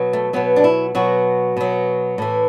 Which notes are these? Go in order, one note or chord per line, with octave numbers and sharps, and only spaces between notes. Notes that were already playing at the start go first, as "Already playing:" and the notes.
Already playing: B2 F#3
A3
B2 F#3 B3
D4
E4
B2 F#3 F#4
B2 F#3
A2 E3